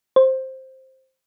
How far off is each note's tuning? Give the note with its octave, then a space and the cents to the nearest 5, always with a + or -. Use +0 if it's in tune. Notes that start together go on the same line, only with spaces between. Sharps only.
C5 +5